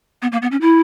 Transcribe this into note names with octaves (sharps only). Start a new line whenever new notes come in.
B3
A#3
B3
C#4
E4